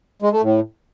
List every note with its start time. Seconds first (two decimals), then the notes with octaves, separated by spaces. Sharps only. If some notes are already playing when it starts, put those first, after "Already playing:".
0.22 G#3
0.32 A3
0.42 A2